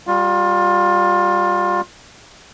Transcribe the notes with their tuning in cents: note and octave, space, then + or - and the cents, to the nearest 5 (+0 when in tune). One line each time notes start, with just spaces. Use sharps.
G3 +0 F4 +25